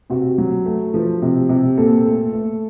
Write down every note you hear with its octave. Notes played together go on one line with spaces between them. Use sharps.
C3 F#4
F#3
A3
F3
C3
C3
A#2 A4
A3
A3